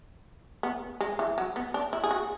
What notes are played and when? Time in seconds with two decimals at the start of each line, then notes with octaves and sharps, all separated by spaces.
0.63 B3
1.01 G#3
1.19 E3
1.38 F#3
1.56 B3
1.74 D4
1.93 E4
2.04 G#4
2.11 F#4